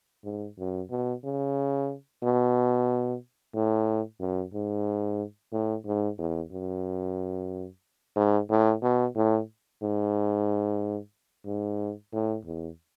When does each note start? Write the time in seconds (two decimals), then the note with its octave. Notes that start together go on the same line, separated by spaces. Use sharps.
0.24 G#2
0.59 F#2
0.90 B2
1.24 C#3
2.23 B2
3.55 A2
4.20 F#2
4.54 G#2
5.52 A2
5.86 G#2
6.18 E2
6.51 F#2
8.16 G#2
8.50 A2
8.82 B2
9.16 A2
9.82 G#2
11.46 G#2
12.13 A2
12.45 E2